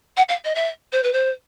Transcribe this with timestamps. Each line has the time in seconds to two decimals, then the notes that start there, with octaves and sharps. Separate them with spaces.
0.17 F#5
0.29 F5
0.44 D#5
0.55 E5
0.92 C5
1.03 B4
1.13 C5